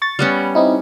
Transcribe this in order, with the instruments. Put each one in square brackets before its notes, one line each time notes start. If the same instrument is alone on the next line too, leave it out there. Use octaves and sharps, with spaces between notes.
[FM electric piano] C#6 A6
[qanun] G3 B3 C#4
[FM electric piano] C4 D#4 E4